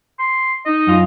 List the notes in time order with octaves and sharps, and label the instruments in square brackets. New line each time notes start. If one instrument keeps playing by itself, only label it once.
[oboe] C6
[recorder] D#4 [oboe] D#5
[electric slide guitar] F#2 F4